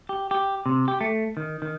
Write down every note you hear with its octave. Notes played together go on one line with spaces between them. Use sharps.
G4
G4
C3
G4
A3
D#3
D#3